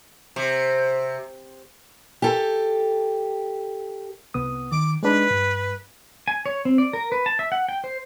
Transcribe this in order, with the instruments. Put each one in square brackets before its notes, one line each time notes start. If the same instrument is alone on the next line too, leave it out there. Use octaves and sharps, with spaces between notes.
[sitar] C3
[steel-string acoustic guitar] G4 A4
[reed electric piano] C2 B3 D#6
[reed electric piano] D#3 [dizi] D6
[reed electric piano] G#3 D4 D#4 [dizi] B4
[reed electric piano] G2
[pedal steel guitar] G#5
C#5
C4
D5
A#4
B4
A5
E5
F#5
G5
C5